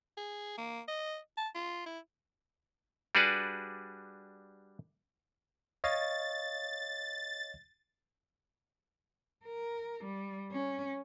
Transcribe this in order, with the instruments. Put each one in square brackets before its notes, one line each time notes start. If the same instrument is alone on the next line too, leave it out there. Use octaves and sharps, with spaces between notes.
[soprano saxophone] G#4
A#3
D#5
A5
F4
E4
[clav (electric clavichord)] G3 D4 F#4 G#4 B4 D5
[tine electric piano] C#5 D#5 F5 [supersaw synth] A6
[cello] A#4
G3
C#4